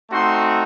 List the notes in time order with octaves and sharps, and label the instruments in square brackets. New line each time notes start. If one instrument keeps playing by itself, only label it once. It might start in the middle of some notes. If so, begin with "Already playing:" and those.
[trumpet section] A3 C4 D#4 F#4 C6